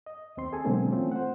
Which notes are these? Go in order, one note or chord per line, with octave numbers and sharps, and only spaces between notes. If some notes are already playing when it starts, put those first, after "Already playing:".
D#5
D#2 C4 C6
G#4 A4 G#5
B2 D3 F#3 G#3 A#3 C4
E3 A3 C4 C#4 F4
C5 F#5